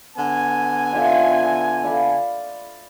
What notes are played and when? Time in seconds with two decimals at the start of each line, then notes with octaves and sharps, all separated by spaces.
0.16 D3 B3 G#5
0.93 F4 D5 E5
1.84 D5 F5 B5